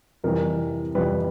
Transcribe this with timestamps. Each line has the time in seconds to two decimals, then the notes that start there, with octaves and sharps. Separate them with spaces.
0.24 F2 C3 E3 G3 A#4
0.95 F2 C3 E3 G3 B4